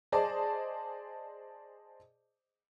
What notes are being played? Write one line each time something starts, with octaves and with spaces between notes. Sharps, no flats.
G#4 C5 D5 D#5 A5